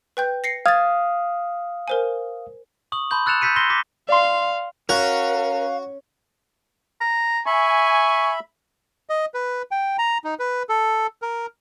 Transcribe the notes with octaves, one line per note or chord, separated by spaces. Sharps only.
B4 G5 G6
A#6 C7 C#7
F5 D#6 G#6 A6
A#4 C5 G#5
C#6 D#6 F#7
A5 B5 C6 G6 F#7
E6 F#6 A6 C#7 E7 F7
E6 G6 A6 B6 C#7 D#7
C6 E6 G6 A#6 C7 G7
D6 A#6 B6
D5 F5 C6
C#4 F#4 A#4 F5
A#5
E5 G#5 B5 C#6
D#5
B4
G5
A#5
D#4
B4
A4
A#4